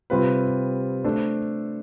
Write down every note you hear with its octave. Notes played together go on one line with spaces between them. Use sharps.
C3 G3 C4 F4 B4
A3 D4 A4 C5